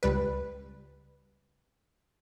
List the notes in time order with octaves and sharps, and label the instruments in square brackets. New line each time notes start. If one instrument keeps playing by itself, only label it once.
[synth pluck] C#2 G3 B4